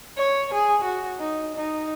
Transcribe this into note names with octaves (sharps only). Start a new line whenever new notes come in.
C#5
G#4
F#4
D#4
D#4